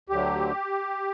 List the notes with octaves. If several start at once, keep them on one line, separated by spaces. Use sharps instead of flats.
D2 D3 F#3 G4